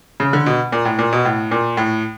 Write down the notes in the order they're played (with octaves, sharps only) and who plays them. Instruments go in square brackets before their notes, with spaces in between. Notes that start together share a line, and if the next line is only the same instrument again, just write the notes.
[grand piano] C#3
D3
B2
A#2
A2
A#2
B2
A2
A#2
A2